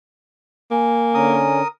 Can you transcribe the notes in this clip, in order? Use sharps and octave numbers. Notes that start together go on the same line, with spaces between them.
A#3 G#5
D3 C#4 A#4 D#6